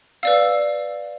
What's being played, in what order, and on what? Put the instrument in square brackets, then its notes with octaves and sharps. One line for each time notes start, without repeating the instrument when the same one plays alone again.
[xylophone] B4 D5 F5 E6